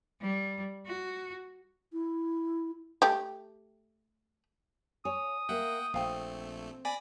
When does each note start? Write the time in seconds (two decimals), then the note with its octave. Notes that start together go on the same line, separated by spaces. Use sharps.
0.21 G3
0.86 F#4
1.93 E4
3.02 A3 G4
5.05 C#5 G#5 D#6
5.49 A#3 E5 F#5 G5
5.94 A#1 A3 C4 F5 G5
6.85 D5 G#5 B5 A#6